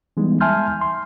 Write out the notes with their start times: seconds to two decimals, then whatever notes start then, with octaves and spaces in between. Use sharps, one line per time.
0.17 E3 G3 G#3 B3 D#4
0.41 E5 G#5 A5 C6 F6 G6
0.81 C6